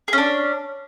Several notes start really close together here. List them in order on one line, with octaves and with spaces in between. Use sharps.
G#4 C#4 D4